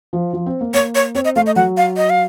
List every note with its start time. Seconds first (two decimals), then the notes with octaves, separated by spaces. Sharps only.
0.13 F3
0.33 F3
0.46 C4
0.61 A#3
0.74 A#3 C#5
0.95 C#5
1.15 C4 C#5
1.25 D#5
1.36 A3 F5
1.46 D#5
1.56 F#3 F#5
1.77 F5
1.97 D#5
2.10 F5